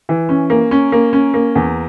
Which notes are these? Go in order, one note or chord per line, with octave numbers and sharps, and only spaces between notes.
E3
C#4
A#3
C#4
A#3
C#4
A#3
E2